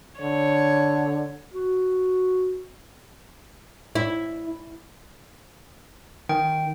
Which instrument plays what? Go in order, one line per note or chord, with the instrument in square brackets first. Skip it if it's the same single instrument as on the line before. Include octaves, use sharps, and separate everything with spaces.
[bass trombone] D3 [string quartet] C#5
[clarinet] F#4
[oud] E4
[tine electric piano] D#3 [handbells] G5